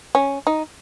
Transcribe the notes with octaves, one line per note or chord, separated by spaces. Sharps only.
C#4
D#4